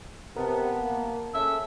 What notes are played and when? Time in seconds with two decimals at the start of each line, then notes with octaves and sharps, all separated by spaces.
0.36 C3 B3 A#4 A5
0.81 A#3
1.33 C#4 G#4 A4 E5 E6